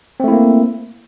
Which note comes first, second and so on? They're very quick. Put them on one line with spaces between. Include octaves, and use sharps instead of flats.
C4 A3 E4 A#3